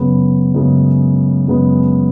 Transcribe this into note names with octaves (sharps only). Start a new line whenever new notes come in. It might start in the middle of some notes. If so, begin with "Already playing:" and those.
Already playing: F#2 C#3 G#3 B3
F#2 C#3 G#3 B3
F#2 C#3 G#3 B3